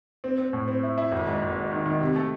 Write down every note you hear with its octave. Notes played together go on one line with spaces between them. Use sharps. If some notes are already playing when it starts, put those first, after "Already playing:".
C4
C4
A2
C4
E4
E4
G#1
G#2
G#1
G#2
D#3
D#3
C3
A3